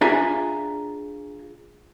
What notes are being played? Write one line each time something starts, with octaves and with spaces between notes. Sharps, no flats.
D4 F4 G#4 E5 G#5 A#5